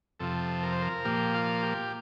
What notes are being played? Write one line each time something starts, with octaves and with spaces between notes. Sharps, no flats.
F2 C3 F3 A4
A#4
C5
A#4
A#2 F3 A#3 G4
F4
G4